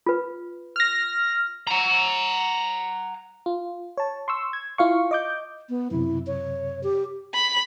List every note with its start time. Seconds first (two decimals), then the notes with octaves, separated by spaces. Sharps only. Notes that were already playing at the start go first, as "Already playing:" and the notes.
0.06 F4 B4
0.76 F6 A#6
1.67 F#5 A#5
3.46 F4
3.97 C#5 A5
4.28 C6 C#6 E6
4.53 G#6
4.78 E4 F4 F5 C#6
5.11 D#5 D6 G6
5.69 B3
5.91 F#2 C3 E4
6.27 C#5
6.83 G4
7.35 B5